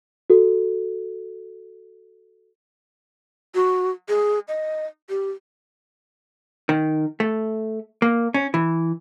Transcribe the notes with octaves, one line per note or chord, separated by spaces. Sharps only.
F#4 A4
F#4
G#4
D#5
G4
D#3
A3
A#3
C#4
E3